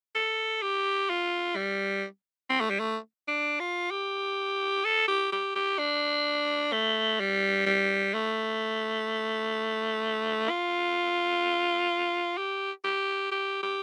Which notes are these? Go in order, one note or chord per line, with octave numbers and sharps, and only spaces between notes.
A4
G4
F4
G3
C4
A3
G3
A3
D4
F4
G4
A4
G4
G4
G4
D4
A3
G3
G3
A3
F4
G4
G4
G4
G4